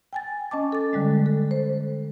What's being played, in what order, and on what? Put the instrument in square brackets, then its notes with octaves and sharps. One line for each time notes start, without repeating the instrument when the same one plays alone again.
[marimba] G5 G#5 A6
C#4 D#5 A5 D6
A4 A6
D3 G3 G#3
A4
C5